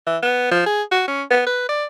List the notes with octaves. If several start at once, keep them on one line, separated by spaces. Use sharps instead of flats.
E3
B3
F3
G#4
F#4
C#4
B3
B4
D5